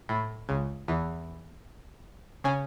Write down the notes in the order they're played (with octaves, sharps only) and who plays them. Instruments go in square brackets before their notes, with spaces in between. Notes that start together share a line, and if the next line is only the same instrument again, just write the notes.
[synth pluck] A2
C#2 C#3
E2 E3
C#3 C#4